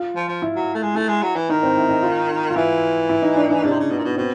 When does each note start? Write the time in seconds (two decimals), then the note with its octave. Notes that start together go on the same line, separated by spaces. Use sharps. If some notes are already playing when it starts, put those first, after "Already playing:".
Already playing: F4
0.16 F3
0.28 F3
0.42 E4
0.56 F#3
0.74 A3
0.83 G#3
0.95 A3 E4
1.08 G#3
1.22 F#3
1.35 E3
1.49 D#3 D#4
1.63 C4
1.77 E4
1.89 D#4
2.03 F4
2.50 F4
2.56 E3 E4
3.09 E4
3.22 D#4
3.36 D4
3.49 D#4
3.64 C#3 D4
3.71 C3
3.79 C#3
3.91 B2
3.98 A#2
4.04 B2
4.17 B2 C4